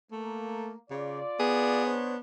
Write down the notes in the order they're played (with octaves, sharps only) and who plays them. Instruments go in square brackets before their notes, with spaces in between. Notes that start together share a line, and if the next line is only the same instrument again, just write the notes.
[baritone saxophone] A3 [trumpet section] A#3
[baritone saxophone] C#3 [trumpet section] F4 D5
[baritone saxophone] B3 [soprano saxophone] G#4
[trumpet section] D4 C5 C#5